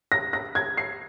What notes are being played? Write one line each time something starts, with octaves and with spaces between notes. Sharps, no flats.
A#6
A#6
G#6
C7